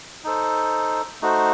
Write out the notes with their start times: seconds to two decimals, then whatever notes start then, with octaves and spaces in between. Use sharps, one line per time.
0.24 D#4 A4 C5
1.22 A3 D#4 F#4 C5